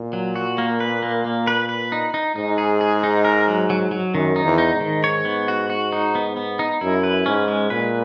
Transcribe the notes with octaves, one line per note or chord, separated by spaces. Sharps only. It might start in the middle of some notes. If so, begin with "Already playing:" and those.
Already playing: A#2
F#3
F#4
A#3
B4
A#3
A#3
B4
B4
D#4
D#4
G#2 D#4
G#4
G#4
D#4
A#4
F#3
F#3
F#3
F#2 D#3
D#4
E2
D#4
G#2
D#3
C#5
B3
F#4
F#4
D#4
B3
B3
D#4
F#2 E4
B4
G#2 C#4
G#3
A#2 B4